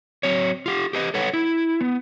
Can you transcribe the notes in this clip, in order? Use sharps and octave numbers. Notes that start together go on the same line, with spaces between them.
F#3 C4 C#5
F4 G4
G4 B4 D#5
A4 B4 C#5 F#5
E4
B3